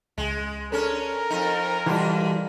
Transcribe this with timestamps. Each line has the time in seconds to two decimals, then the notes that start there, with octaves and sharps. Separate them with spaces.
0.18 C#2 G#3 G#5
0.72 C#4 D4 A4 A#4
1.30 F2 D#4
1.86 B2 E3 G3 F4